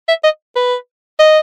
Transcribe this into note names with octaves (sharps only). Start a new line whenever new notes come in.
E5
D#5
B4
D#5